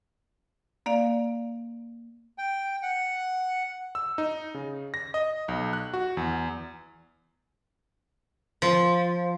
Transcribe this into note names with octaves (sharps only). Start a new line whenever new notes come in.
A#3 D5 F5
G5
F#5
E6
D#4
C#3
A#6
D#5
B1
F#6
F#4
E2
F3